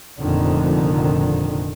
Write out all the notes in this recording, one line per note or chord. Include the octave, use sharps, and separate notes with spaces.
F1 F2 A#2 D3 D#3